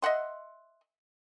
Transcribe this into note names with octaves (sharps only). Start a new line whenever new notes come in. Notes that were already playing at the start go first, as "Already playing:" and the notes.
D#5 E5 F#5 C6